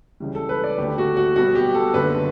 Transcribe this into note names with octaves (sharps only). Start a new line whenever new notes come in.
C#2 C#3 E3 G3
A4
B4
D5
D2 D3 A3 G4
F#4
F#4
B1 B2 G3 B3 F#4
G4
A4
F#1 F#2 D3 B4